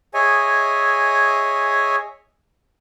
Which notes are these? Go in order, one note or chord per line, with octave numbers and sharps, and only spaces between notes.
G#4 C#5 D#5 E5 G#5